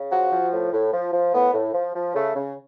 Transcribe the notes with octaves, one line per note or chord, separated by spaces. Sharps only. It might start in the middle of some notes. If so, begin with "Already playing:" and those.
Already playing: C#3
F3 F#4
F3
A2
A2
F3
F3
A2 B3
A2
F3
F3
C#3 A3
C#3